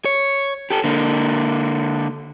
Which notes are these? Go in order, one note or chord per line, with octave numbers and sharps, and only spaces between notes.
C#5
G4 A4
D3 A#3